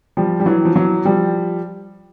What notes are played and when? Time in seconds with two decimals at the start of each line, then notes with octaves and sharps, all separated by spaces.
0.17 F3 G3
0.40 G3
0.46 E3 F#3
0.65 F3
0.76 E3 F#3
1.05 F3 G3